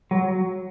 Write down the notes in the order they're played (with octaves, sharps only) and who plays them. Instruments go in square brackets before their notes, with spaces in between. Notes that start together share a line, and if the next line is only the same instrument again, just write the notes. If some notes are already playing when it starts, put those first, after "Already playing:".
[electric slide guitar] F#3